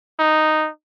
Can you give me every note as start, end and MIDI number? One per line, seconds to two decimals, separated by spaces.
0.19 0.69 63